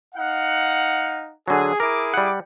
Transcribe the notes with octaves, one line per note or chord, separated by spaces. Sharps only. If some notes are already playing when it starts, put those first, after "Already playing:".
D#4 F5 F#5
D3 F#3 G#4
E4 G#4 A#4 D6
G3 F#5